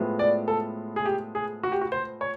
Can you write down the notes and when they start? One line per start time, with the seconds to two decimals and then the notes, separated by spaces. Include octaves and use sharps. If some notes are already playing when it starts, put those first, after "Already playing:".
Already playing: A2 F3 G#3 B3
0.19 D5
0.48 A4
0.96 G#4
1.06 G4
1.35 G#4
1.63 F#4
1.72 G4
1.81 F#4
1.92 C5
2.21 C#5